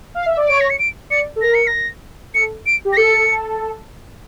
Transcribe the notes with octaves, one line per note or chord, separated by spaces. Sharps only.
F5
E5
D5
C#5 D7
A#6
C#7
D7
D5 C#7
A4
A#4 A#6
C#7
A#6
A4 C#7
D7
G4
A#6
A4 C#7